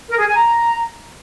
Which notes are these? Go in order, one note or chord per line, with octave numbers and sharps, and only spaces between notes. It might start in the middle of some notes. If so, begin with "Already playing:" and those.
A#4
G#4
G#5
A#5